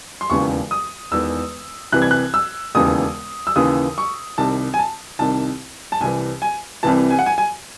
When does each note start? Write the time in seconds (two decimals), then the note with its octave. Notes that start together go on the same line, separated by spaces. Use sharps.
0.21 C6
0.30 E1 D#2 C#3 E3 C#6
0.71 D#6
1.11 E1 E2 D#3 E6
1.92 C2 C3 E3 F#6
2.02 G#6
2.11 F#6
2.34 E6
2.75 E1 D#2 C#3 E3 D#6
3.47 E6
3.56 D#2 C#3 E3 D#6
3.98 C#6
4.38 C2 C3 D#3 A5
4.74 G#5
4.79 A5
5.19 C2 C3 D#3 A5
5.92 A5
6.01 C2 C3 E3 G#5
6.42 G#5
6.83 C2 C3 E3 A5
7.10 G#5
7.19 F#5
7.26 G#5
7.38 G#5